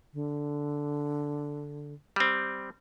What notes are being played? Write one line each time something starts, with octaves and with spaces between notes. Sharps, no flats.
D3
G3 C4